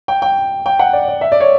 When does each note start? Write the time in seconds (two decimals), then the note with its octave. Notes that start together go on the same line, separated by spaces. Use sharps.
0.08 G5
0.22 G5
0.66 G5
0.79 F#5
0.93 D5
1.08 D5
1.21 E5
1.32 D5
1.40 C#5